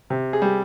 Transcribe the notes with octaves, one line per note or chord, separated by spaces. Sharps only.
C3
G#4
G3